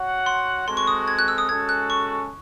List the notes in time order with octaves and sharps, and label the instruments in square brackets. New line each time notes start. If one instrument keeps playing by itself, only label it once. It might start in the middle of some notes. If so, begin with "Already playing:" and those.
Already playing: [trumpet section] F#4 C#5 F#5
[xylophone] C6
[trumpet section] G#3 C4 F#4 A4 [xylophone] C6
[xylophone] C#6
D#6
G#6
F#6
E6
D#6
[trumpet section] G#3 C#4 F#4 A4 [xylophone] G#6
[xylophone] F#6
C#6